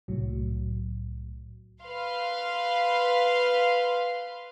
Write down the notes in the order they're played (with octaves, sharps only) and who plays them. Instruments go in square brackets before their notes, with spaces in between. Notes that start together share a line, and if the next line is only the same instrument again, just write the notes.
[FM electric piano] C2 A2 F#3
[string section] B4 F5 C6